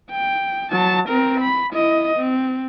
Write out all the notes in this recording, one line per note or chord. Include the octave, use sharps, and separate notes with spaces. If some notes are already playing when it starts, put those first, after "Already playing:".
G5
F#3 A5
C4 A#4
B5
E4 D#5
C4